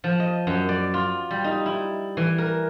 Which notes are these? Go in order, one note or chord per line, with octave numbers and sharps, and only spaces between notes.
F3
D#5
F#2
D5
F4
G3
D#4
E4
E3
A#4